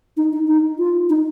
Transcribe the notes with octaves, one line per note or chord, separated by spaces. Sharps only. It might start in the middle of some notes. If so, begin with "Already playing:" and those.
D#4
D#4
D#4
F4
D#4